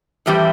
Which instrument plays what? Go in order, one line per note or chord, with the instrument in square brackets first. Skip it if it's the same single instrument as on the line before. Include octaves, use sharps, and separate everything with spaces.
[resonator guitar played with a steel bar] A2 E3 G3 C4 G4